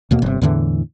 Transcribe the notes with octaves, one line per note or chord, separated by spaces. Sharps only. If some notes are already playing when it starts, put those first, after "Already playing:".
D#2 B2 A#3
G1 C3
E2 A2 D3 E3